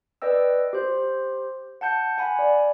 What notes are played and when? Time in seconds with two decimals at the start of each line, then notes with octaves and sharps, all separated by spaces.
0.22 B4 D5 D#5 G5 E6
0.73 G4 C5
1.81 F#5 A5 G6 C#7
2.18 F#5 G#5 B5
2.39 D5